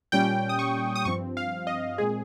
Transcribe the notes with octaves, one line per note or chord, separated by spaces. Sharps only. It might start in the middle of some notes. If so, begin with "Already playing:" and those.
A#2 G3 C#4 G5
D#6
C#6
D#6
G2 F3 C4 C#6
F5
D#5
A#2 G#3 C4 G#4